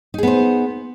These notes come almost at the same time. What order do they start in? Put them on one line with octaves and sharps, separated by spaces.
D#4 G#4 B3 C5